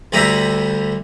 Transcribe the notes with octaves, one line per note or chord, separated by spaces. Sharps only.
D2 D3 G3 G4 E5 A#5